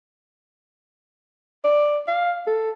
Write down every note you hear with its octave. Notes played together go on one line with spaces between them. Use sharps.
D5
F5
A4